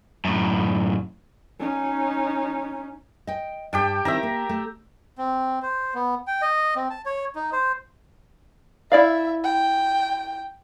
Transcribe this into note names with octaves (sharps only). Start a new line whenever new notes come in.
F#2 A2
C#4 D#4
D#5 G5
G2 G4 G5 A5
D#3 C4 E4 E5 A#5
A#3
A3
C4
C5
B3
G5
D#5
C4
A5
C#5
D#4
C5
E4 D5 E5 F5
G5